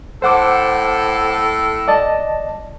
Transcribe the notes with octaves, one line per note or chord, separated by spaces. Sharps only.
A2 A4 C5 F#5 D6
D5 D#5 A5